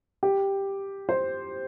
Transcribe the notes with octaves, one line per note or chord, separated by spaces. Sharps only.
G4
C5